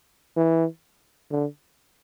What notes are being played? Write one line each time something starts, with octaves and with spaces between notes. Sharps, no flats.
E3
D3